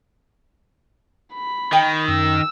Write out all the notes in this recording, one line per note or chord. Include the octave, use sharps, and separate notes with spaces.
B5
D#3 G5
F#2 E6